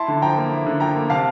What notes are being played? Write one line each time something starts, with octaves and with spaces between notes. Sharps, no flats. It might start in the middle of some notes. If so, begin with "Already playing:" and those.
Already playing: E4 A5 C6
D3
F3 G5 A#5
A#3
E4
D3
F3 G5 A#5
A#3
C3 F5 A5